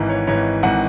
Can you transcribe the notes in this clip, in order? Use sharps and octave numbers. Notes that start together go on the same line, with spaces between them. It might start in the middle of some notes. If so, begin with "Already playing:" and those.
Already playing: G#1 G#2 E3
C#5
G#1 G#2 E3 C#5
G#1 E3 F#5